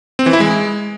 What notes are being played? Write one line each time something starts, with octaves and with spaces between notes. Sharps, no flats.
C4
E3
E4
G#3